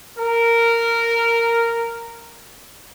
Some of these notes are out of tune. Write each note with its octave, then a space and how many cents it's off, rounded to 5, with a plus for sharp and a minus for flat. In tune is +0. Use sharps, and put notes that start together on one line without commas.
A#4 -10